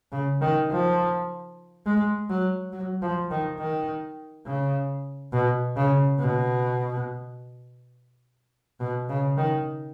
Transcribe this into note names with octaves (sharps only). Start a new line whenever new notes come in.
C#3
D#3
F3
G#3
F#3
F#3
F3
D#3
D#3
C#3
B2
C#3
B2
B2
C#3
D#3